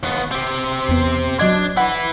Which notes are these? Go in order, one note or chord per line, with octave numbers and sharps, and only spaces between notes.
D#2 B3
C4 G4
E2 B3
F#3 D4 D#5 G#6
E4 B4 F#5